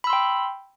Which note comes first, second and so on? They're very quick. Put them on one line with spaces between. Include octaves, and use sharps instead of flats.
B5 E6 C6 G5